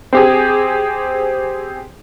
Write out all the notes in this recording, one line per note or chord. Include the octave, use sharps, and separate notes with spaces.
C4 G4 G#4